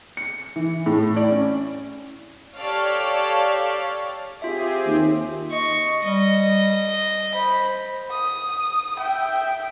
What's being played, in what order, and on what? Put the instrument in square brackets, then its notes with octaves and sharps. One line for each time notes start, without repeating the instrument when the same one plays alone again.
[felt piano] C#7
E3
A2
D5
C#4
[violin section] G4 A4 C#5 D5 F5
[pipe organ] C4 G4 G#4 [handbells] F4 E5
[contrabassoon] D#2
[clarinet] D#5 [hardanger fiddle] C#6
[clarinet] G3 [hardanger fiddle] D#5
[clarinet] C5 [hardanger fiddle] B5
[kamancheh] D#6
E5 G5